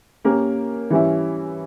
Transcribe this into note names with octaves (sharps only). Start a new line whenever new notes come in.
A#3 C#4 G4 A#4
E3 G3 C#4 E4